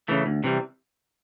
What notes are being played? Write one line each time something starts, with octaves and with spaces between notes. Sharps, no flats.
C#3 E3 A3
D2
C3 E3 G3